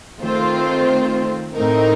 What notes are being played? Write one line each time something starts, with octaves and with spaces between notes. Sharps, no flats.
D#3 A3 C4 F4 C5
A2 A3 C4 D#4 A#4